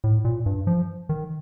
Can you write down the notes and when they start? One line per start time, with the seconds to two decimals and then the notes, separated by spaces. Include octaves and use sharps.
0.04 A2
0.25 A#2
0.46 G2
0.67 F3
1.09 D#3